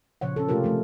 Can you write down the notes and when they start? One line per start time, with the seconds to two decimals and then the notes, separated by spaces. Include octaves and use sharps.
0.21 A#2 C#3 F3 C#5 F#5
0.36 C#4 A4
0.48 C3 G#3 A3 F4 G4 A#4
0.64 F3 G#3 A3